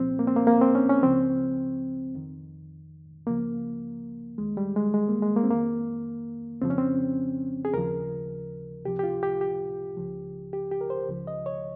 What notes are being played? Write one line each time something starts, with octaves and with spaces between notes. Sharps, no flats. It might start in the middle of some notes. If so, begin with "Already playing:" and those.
Already playing: C2 A#2 F3 C4
A#3
C4
A#3
A#3
C4
C#4
C#4
C#2 C#3 F3 C4
F2 D#3
C#2 C#3 F3 A#3
D#2 D#3 G#3
G3
G#3
G#3
A#3
G#3
A#3
C4
F2 D#3 A#3
F2 C#3 F3 C4
C#4
C4
G#4
D#2 C#3 F3 A#4
C#2 C3 F3 G4
G4
F4
G4
G4
C#2 C#3 F3
G4
G4
A#4
C5
C#2 C#3 F3
D#5
C#5